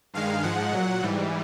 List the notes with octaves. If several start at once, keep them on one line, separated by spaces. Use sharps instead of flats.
G2 D#3 G#3 F5
G#2 F3 G#3 F#5
A#2 F#3
G#2 E3 G3